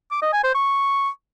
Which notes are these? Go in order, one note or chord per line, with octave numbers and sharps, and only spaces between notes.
D6
D#5
G#5
C5
C#6